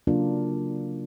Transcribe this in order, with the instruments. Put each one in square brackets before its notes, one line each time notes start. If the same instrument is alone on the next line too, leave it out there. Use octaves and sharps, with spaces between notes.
[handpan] C#3 F#3 A#3 D4 F4 A#4